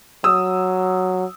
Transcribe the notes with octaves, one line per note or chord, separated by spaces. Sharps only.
F#3 D#6 E6